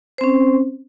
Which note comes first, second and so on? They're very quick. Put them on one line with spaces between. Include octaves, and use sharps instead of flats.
C5 C4 C#4